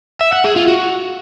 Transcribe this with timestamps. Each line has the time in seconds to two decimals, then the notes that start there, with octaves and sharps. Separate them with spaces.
0.21 E5
0.33 F#5
0.44 G#4
0.56 F4
0.68 F#4